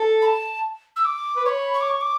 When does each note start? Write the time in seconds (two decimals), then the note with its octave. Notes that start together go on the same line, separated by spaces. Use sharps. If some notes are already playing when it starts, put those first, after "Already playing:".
Already playing: A4
0.22 B5
0.26 A5
0.96 E6
1.05 D6
1.37 B4
1.46 C#5 B5 C#6
1.74 C#6
1.81 D6
1.89 C#6
2.01 D6